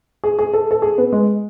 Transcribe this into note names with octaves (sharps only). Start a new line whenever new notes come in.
G#4
G#4
A4
A4
G#4
B3
G#3